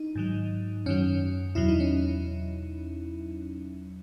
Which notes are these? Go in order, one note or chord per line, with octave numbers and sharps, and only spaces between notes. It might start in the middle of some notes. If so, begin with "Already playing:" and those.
Already playing: D#4
G#2 D#3 F#3
F#2 D#3 F#3 C#4
E2 B2 F#3 E4
D#4
C#4